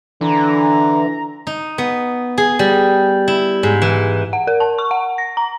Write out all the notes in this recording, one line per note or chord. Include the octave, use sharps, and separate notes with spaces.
D3 E3 A#5
D#4
B3
G#4
G3
E4
G#2
E3
F#5
A#4
A5
C#6
F#5
A#6
A#5